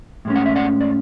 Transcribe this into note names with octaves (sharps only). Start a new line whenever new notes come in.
A2 G#3 C#4
F#5
E5
D5 F#5
D5